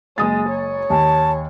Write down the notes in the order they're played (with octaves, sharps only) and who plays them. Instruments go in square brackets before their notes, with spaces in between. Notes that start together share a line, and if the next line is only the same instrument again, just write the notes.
[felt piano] F#1 D#6 A6 [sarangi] G#3
[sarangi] C#5
[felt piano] D#2 G#5 [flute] A5